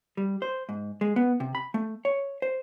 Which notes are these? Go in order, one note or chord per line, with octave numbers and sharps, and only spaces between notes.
G3
C5
G#2
G#3
B3
C3
B5
A3
C#5
C5